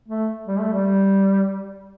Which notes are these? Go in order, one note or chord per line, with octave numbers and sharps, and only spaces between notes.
A3
G3
A3
G3